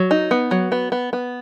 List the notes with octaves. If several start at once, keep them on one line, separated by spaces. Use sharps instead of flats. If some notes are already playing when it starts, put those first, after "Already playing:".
Already playing: F#3
D#4
B3
F#3
B3
B3
B3